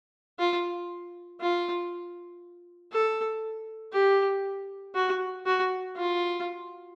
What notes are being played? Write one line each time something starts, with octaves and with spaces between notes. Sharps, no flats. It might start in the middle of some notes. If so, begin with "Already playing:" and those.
F4
F4
A4
G4
F#4
F#4
F4